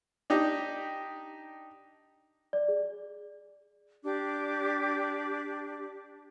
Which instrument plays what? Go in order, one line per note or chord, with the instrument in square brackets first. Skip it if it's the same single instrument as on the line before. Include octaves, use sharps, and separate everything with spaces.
[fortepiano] D4 D#4 G4
[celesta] D5
G#4
[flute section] D4 G4 D6